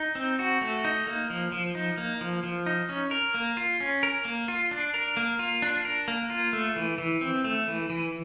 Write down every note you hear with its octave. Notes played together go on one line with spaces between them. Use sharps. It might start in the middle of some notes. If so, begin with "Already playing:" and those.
Already playing: D#4
C4
F#4
A3
D#4
A#3
F3
F3
D#4
A#3
F3
F3
D#4
C#4
A#4
A#3
F4
C#4
A#4
A#3
F4
D4
A#4
A#3
F4
D4
A#4
A#3
F4
A3
E3
E3
C4
A3
E3
E3